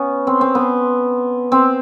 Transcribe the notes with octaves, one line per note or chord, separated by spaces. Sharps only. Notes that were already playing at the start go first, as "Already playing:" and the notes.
Already playing: B3 C#4
C4
C4
B3
C4